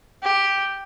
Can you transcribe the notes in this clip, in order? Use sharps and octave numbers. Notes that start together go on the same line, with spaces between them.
G4